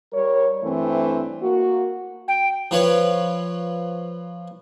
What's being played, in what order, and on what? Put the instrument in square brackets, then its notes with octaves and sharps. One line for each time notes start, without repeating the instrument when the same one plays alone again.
[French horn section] G3 A#4 C#5
G2 E3 A3 C4
A#3 F#4
[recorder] G5
[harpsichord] F3 B4 C#5